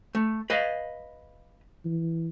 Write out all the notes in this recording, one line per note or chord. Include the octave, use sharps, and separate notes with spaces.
A3
B4 D#5 F5
E3